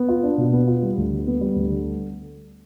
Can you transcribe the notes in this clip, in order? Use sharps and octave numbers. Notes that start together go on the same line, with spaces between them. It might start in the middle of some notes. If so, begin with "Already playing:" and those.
Already playing: B3
F4
D4
B2
B3
F4
G3
D2
D3
B3
G3
D2
D3